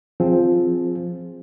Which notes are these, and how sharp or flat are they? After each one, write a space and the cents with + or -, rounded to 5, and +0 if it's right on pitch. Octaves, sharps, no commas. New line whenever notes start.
F3 +0 C4 +0 G#4 +0